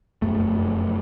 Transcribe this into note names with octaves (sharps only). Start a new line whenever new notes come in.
F1 F#2 A3